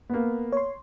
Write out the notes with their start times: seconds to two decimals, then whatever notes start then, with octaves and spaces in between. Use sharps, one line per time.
0.09 A#3 B3
0.52 C#5 C6